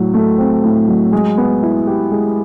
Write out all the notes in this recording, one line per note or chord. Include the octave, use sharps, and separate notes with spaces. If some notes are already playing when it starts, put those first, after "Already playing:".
Already playing: A2 F#3
A3
C4
A2
F#3
G#3
B3
E4
G4
G#3